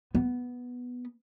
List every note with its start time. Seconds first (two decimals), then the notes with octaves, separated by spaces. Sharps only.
0.15 B3